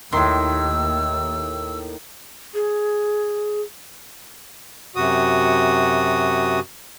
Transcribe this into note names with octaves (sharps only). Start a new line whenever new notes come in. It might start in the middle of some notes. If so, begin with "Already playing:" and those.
D#2 A2 D#3 C6 E6
G#4
F#2 C3 F#4 D#6